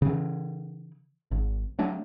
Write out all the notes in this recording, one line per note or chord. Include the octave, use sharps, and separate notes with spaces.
C#3 E3
G#1
F#3 A3 D4